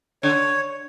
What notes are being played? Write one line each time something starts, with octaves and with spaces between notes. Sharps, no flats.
D3 C#5